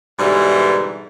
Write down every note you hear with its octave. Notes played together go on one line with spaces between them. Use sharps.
G#2 B2 D3 E3 G3